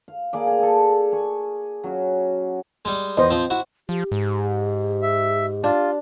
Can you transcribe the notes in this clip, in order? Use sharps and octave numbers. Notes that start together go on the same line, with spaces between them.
F5
A#3 G#4 D5
G#4 F5
G#4 A4
G#4 C#6
F#3 C#4 F#4
G3 G#3
E2 C5 D#5
F3 C4
E4 F#4
F3 G4
G#2
E5
D4 F4